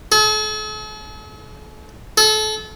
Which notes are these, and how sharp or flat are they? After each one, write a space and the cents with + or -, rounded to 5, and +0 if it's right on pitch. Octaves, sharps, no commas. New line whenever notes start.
A4 -45
A4 -30